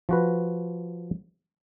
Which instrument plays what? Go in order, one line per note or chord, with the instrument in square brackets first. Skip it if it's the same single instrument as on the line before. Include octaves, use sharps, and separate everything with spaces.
[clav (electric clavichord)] F3 F#4 B4